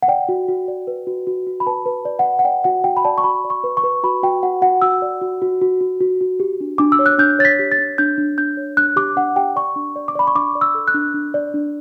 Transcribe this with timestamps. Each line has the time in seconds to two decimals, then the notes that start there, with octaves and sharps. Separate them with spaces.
0.02 F#5
0.08 D5 G5
0.29 F#4
0.48 F#4
0.68 D5
0.87 B4
1.07 F#4
1.27 F#4
1.47 F#4
1.60 B5
1.67 B4 A5
1.86 B4
2.05 D5
2.19 F#5
2.25 D5
2.39 F#5
2.45 D5 G5
2.64 F#4 F#5
2.84 F#4 G5
2.97 B5
3.05 D5 A5
3.18 C#6
3.24 F#4 B5
3.44 D5
3.50 C#6
3.64 B4
3.77 C#6
3.83 B4
4.03 F#4 B5
4.23 F#4 G5
4.43 F#4 F#5
4.62 F#4 F#5
4.82 F#4 E6
5.02 D5
5.21 F#4
5.42 F#4
5.62 F#4
5.81 F#4
6.01 F#4
6.21 F#4
6.40 G4
6.60 D4
6.78 D4 D6
6.92 E6
6.99 C#5
7.06 F#6
7.18 D4 G6
7.39 C#5 A6
7.45 B6
7.59 G4
7.72 A6
7.79 D4
7.98 D4 G6
8.18 D4
8.38 D4 G6
8.57 C#5
8.77 D4 F#6
8.96 G4 D6
9.16 D4 F#5
9.36 G4 G5
9.56 D5 C#6
9.76 D4
9.96 D5
10.08 D6
10.15 D5 B5
10.27 C#6
10.35 D4 D6
10.55 D5
10.61 E6
10.75 A4
10.88 F#6
10.94 D4
11.14 D4
11.34 D5
11.54 D4